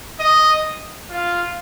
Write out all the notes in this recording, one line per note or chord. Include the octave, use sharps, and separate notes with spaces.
D#5
F4